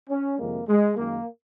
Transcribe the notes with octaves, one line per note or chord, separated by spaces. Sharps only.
C#4
F2 C3 D#3 G#3 A#3
G#3
F#2 D#3 G#3 A#3